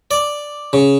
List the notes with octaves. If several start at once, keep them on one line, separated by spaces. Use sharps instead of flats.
D5
C#3